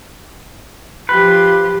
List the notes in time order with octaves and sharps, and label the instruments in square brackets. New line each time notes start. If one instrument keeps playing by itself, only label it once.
[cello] F3 G4 [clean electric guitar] B4